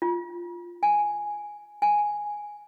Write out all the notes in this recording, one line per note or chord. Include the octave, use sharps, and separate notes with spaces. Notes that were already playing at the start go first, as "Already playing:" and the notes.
F4
G#5
G#5